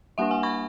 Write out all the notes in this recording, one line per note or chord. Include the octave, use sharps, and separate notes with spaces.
G3 A#3 D4 E5 F#5
F#5 G#5
B5 C#6